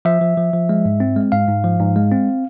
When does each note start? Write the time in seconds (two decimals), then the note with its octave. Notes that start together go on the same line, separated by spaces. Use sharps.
0.05 F3 E5
0.21 F3
0.37 F3
0.53 F3
0.69 G#3
0.85 G#2
1.00 C4
1.16 G#3
1.32 G#2 F5
1.48 G#2
1.64 F3
1.79 G#2
1.96 G#3
2.12 C4